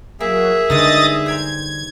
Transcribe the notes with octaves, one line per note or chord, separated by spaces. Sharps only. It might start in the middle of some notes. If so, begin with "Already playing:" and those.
F#3 A#3 G#4 E5
G2 D3 G#3 D#4 D#5 D#6 A6
C5 G5 A#5 G#6